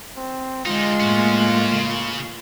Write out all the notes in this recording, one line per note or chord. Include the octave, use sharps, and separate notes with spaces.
C4
D3 G#3 D#4 F4
A2 A#3 C#4 F#4
C#3